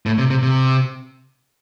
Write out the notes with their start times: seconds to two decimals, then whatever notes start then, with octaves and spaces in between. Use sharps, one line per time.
0.06 A2
0.18 C3
0.30 C3
0.43 C3